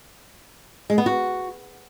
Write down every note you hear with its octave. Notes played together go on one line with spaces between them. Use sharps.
G#3
B3
F#4